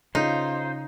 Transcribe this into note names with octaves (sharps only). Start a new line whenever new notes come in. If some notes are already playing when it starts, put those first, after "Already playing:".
C#3 D#4 F4 C5